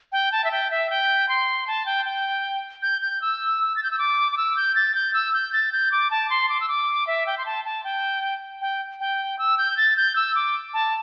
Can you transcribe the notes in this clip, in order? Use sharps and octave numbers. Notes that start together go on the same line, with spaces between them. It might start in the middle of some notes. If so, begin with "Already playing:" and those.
G5
A5
E5
G5
E5
G5
C6
A5
G5
G5
G6
G6
E6
A6
G6
E6
D6
D6
E6
G6
A6
G6
E6
G6
A6
G6
D6
A5
C6
D6
E6
D6
E5
G5
C6
A5
A5
G5
G5
G5
E6
G6
A6
G6
E6
D6
A5